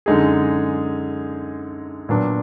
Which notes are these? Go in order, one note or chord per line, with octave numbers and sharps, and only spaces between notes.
F#2 D3 G#3 D#4 G#4
A#2 F#3 B3 D4